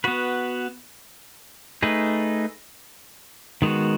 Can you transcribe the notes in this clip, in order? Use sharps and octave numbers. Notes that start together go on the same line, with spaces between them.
B3 F#4 B4
A3 D#4 G#4 B4
D#3 G#3 B3 F#4